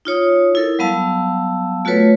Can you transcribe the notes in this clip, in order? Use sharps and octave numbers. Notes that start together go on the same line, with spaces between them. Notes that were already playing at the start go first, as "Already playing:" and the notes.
D#4 F4 C#5 D#6
E4 A4 A#4
F#3 G3 B3 F5 A5 E6
A3 F4 F#4 A4 B4 C#5